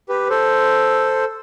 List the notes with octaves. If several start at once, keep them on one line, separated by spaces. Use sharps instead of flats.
G4 B4
A4 C5